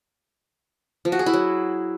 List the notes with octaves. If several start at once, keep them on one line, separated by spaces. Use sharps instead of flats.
F3
F#4
G#4
E4
F#3